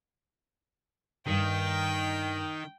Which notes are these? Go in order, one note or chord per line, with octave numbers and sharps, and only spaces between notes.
G2 D#3 A#4 G5